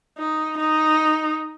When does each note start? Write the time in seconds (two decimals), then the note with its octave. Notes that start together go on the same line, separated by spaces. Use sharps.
0.18 D#4
0.57 D#4